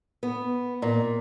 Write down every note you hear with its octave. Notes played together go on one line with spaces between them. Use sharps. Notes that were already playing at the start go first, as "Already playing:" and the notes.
B3
A#2